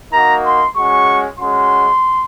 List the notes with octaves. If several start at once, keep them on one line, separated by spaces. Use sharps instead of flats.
A#3 D#4 F#4 A#5
C6
G#3 C#4 F#4 C#6
G#3 C#4 F#4 C6